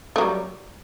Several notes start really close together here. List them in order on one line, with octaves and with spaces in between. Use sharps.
A3 F#3 G3